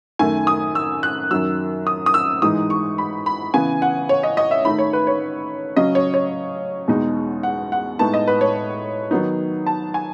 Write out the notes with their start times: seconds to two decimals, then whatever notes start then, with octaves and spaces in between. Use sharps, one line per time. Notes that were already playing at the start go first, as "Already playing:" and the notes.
0.19 F#2 D#3 A3 G#5
0.47 D#6
0.75 E6
1.03 F#6
1.31 F#2 D#3 F#3 E6
1.87 D#6
2.06 D#6
2.14 E6
2.42 G#2 E3 G#3 D#4 D#6
2.70 C#6
2.98 B5
3.26 B5
3.54 C#3 E3 B3 G#5
3.82 F#5
4.09 C#5
4.23 D#5
4.37 D#5
4.51 E5
4.65 D#3 A3 D#4 B5
4.78 C#5
4.93 B4
5.07 C#5
5.76 C#3 F#3 C#4 D#5
5.95 C#5
6.14 C#5
6.88 E2 B2 G#3 D#4
7.43 F#5
7.72 F#5
7.99 A2 G#3 B3 D#4 A5
8.14 D#5
8.28 B4
8.41 C#5
9.11 D#3 F#3 B3 D#4
9.66 A5
9.94 G#5